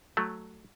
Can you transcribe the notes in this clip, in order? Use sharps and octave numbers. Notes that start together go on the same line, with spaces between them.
F#3 A3